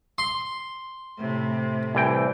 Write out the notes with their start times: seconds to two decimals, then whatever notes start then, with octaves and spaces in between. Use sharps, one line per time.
0.18 C6
1.18 A2 C3
1.95 C2 E3 G5